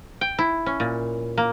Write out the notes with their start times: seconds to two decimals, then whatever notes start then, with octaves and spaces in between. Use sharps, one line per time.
0.21 G5
0.39 E4
0.66 C#4
0.80 A#2
1.37 A#3